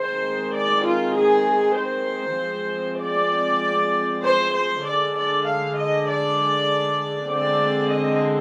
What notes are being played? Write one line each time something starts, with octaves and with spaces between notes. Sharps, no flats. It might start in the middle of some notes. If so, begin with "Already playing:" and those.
Already playing: D#3 G#3 C4 C5
D5
F4
G#4
C5
F3 G#3 C4
D5
C5
C5
D3 G#3 D4 D5
D5
F5
D#5
D5
D3 G#3 C4 D5
D#5